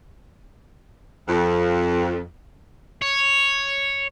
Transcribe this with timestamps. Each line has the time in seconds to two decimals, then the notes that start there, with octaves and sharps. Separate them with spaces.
1.28 F2
3.02 C#5